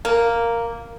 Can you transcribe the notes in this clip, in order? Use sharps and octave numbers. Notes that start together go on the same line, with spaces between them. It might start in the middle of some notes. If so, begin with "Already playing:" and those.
A#3